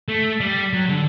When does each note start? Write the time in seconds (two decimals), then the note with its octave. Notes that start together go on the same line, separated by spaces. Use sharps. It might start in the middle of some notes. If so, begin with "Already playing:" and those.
0.09 A3
0.40 G3
0.73 F#3
0.89 D3